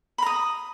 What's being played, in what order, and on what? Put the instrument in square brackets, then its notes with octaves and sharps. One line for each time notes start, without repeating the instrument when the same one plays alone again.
[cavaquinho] B5
A#5
D#6